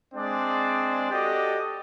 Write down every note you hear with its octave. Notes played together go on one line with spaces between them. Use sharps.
G#3 C4 D4 G#4 D5
F#4 G4 A4 D5 D#5